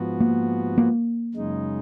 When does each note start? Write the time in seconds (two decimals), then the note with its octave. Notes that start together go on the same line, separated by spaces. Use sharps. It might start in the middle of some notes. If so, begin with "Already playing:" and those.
Already playing: G#2 F3 B3 F#4
0.20 A#3
0.78 A#3
1.34 F#2 C#3 G#3 D#4